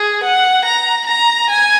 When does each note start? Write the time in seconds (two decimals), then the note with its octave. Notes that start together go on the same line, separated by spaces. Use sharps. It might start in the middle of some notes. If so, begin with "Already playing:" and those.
Already playing: G#4
0.23 F#5
0.65 A#5
1.07 A#5
1.50 G#5